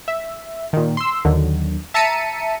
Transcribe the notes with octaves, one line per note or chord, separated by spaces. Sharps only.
E5
A#2 D#3
C6 E6
D#2 D3 D#3 F#3
E5 A5 A#5 B6 C#7 D#7